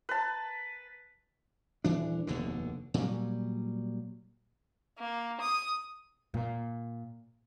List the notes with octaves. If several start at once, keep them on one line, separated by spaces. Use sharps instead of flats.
B4 A5
D#1 E3 D4
F1 D#2 B2 D3
A#2 F#3 G3
A#3
D#6
A#2